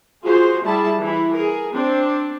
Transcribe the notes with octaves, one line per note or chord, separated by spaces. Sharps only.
F4 F#4 G#4 C5
G3 E4 G#4 A5
E3 E4
G#4 A#4
C4 D4